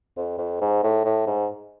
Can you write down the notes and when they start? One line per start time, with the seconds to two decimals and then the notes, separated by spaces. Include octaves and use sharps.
0.17 F2
0.38 F2
0.61 G#2
0.84 A2
1.05 A2
1.27 G#2